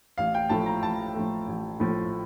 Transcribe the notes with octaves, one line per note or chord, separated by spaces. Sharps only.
A1 F5
G5
A2 F3 A3 A5
A#5
A1 A5
A2 F3 A3
A1
A2 F3 A3